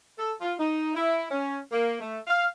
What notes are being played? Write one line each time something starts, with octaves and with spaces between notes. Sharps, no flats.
A4
F4
D#4
E4
C#4
A#3
A3
F5